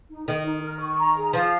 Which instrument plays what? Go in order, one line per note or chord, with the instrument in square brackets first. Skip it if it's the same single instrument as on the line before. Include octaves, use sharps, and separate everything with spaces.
[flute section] D#4
[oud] D#3 [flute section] D#5
[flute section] D#4
A#4
C#6
A#5
G#4
[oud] F3 [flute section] F5